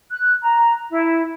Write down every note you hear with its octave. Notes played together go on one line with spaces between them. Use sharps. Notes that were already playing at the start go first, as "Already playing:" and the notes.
F#6
A#5
E4